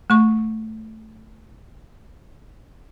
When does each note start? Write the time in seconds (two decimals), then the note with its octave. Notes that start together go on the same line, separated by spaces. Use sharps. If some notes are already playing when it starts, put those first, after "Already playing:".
0.10 A3 C#6